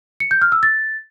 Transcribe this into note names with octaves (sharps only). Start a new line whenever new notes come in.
C#7
G6
F6
E6
A6